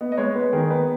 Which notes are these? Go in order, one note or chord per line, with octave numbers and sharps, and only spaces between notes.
B3 D#5
D#5
G#3 C#5
B3 B4
D#3 G#4
B3 B4